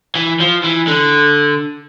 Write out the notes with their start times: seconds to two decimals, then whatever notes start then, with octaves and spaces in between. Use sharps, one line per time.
0.15 E3
0.40 F3
0.64 E3
0.87 D3